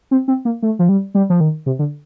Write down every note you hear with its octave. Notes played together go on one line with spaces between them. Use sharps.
C4
C4
A#3
A3
F3
G3
G3
F3
D#3
C3
D3